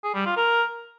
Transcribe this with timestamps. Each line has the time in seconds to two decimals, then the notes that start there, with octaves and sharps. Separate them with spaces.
0.04 G#4
0.15 G3
0.26 F4
0.37 A#4